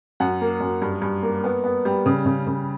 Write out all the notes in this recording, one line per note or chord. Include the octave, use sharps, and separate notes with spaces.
F#2 F#5
A#3
F#2
G2
G2
A#3
B3
B3
G3
C#3
C#3
C#3